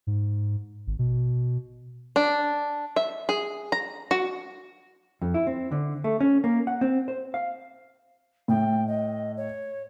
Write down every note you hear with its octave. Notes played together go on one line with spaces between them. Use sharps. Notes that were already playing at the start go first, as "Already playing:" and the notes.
G#2
G#1
B2
D4
E5
G#4
A#5
F#4
F2
E4
C4
D3
A3
C#4
A#3
F#5
C4
C5
F5
A2 G5
D#5
C#5